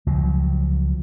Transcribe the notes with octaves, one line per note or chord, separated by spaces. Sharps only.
C#2 F3 F#3